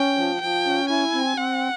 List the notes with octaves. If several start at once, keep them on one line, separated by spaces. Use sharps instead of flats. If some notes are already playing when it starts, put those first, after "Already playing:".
Already playing: C#4 G5
F3
F3 G5
C#4
E4 G#5
C4
C4 F#5